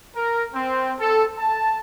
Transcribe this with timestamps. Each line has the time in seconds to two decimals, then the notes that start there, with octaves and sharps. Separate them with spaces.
0.15 A#4
0.54 C4
0.99 A4
1.38 A5